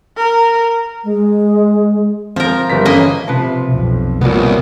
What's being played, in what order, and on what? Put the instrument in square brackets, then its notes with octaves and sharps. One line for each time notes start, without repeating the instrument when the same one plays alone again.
[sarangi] A#4
[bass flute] G#3
[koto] F3 A#4 [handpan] C4
[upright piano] G1 A#4 B6
[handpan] E3 C#4 A4 [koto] A#3 D#5 G#5
[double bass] C3 [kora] F3 B4
[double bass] B1 F2
[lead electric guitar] C2 [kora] A#2 F#3 B3